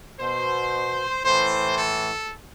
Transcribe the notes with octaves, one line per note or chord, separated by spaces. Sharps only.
B2 C5
A2 E3 C5
A4